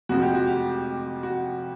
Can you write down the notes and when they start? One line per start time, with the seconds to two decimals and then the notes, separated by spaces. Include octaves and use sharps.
0.09 F2 C3 F3 G#3 F#4
0.22 G4
0.35 F#4
0.47 G4
1.23 F#4